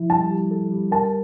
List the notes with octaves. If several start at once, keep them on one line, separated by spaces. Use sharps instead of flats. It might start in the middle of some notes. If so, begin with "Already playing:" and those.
Already playing: F3 E4
G3 A5
G3
A4
G3
A#4 A5